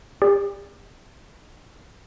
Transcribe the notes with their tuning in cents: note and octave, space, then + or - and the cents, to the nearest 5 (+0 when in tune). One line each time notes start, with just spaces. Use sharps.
G4 +45 D5 +0